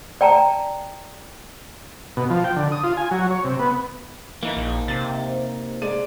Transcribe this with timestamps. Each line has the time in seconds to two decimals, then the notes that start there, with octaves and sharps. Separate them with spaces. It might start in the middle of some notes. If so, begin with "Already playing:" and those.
0.21 D5 G5 A5 A#5
2.17 B2
2.30 F3
2.44 G5
2.56 D3
2.72 D#6
2.84 F4
2.97 G#5
3.11 F#3
3.31 C#5
3.44 C3
3.59 B3
4.43 E3 A#3 D#4
4.57 A#1
4.88 C3 A6
5.82 G#3 D5 D#7